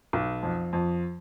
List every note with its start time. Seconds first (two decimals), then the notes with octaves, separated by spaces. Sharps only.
0.13 B1
0.43 F2
0.73 F2